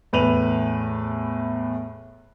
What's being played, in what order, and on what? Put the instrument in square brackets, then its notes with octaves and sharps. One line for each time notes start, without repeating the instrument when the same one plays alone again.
[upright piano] E2 A2 B4 D#7 F7 F#7